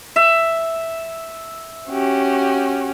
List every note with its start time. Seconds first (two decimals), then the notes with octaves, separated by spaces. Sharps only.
0.16 E5
1.90 C#4 F#4 G4